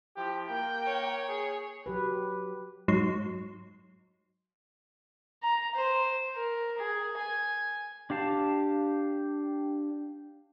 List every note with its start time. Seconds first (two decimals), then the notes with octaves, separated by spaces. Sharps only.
0.17 F3 E4 G4
0.50 A#3 G5
0.86 C#5
1.27 G#4
1.86 F#3 G4 B4
2.88 G#2 F#3 C6
5.43 A#5
5.76 C5
6.35 A#4
6.78 G#4
7.19 G#5
8.10 D4 G4 F5 A5